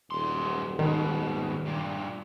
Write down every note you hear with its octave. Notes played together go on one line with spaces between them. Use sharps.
D#1 F#2 C6
G#2 B2 D#3
G2 A#2